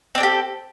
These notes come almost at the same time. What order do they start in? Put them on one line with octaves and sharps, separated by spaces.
C4 D4 A4 G4